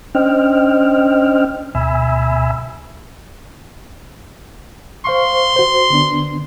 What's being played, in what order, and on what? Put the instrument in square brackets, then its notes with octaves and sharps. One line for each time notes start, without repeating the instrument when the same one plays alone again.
[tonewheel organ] C#4 D4 C5 D#5 G5 F6
D2 B2 E5 G#5 B5 E6
[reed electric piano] C5 F5 C#6 [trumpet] C6
[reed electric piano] F#4 C5
D3 B3 D4